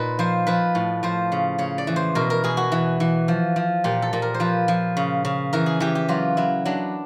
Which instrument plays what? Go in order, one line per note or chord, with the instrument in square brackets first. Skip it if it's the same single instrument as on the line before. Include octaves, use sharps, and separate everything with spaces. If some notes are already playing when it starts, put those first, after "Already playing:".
Already playing: [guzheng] A#2 D#4 B4
F3 C5
F3 B4
A2
F3 C5
C#3
C#3 C#5
D5
E3
C5
B2 A#4
A#4
B2 G#4
F#4
E3
E3
F3
F3
A#2 G4
A4
A#2
A#4
C5
F3 B4
F3
C#3
C#3
E3 A#4
G#4
E3 G4
G4
F#3 F4
F#3 E4
F#3 D4